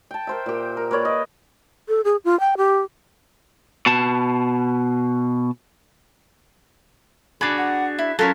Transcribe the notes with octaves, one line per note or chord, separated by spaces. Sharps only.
G5 A5
A#4 C5 E5
A#2 G4
A#4
A#3 B4 C#5 D5
D#5
A4
G#4
F4
G5
G4
B2 A5
D4 F#4 G#4 B5 D6
F#5
E4 E5
F#3 C#4 F4 A4 A#4 C#5